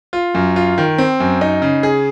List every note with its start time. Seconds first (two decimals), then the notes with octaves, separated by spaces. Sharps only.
0.13 F4
0.35 F#2
0.56 F4
0.78 D#3
0.98 C4
1.20 F#2
1.41 D#4
1.62 C#3
1.83 G#4